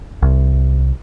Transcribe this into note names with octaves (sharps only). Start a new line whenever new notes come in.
C2